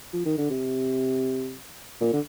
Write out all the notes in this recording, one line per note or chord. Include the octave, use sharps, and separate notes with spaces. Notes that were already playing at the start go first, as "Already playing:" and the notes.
F3
D#3
D3
C3
A#2
D3